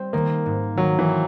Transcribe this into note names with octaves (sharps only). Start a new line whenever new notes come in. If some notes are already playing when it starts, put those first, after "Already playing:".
Already playing: G3 C4
D#3 A#3
G#2
D#3 F#3
E3
C4